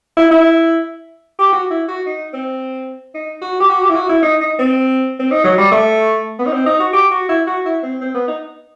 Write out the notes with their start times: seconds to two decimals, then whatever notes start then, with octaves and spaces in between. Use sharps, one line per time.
0.17 E4
0.31 E4
1.39 G4
1.53 F#4
1.71 E4
1.88 F#4
2.06 D#4
2.34 C4
3.15 D#4
3.42 F#4
3.60 G4
3.69 F#4
3.82 G4
3.89 E4
3.96 F#4
4.09 E4
4.23 D#4
4.41 D#4
4.59 C4
5.19 C4
5.31 D#4
5.44 F#3
5.58 G3
5.72 A3
6.39 B3
6.46 D#4
6.52 C4
6.66 D#4
6.80 F#4
6.93 G4
7.11 F#4
7.29 E4
7.47 F#4
7.65 E4
7.83 C4
8.01 C4
8.15 B3
8.28 D#4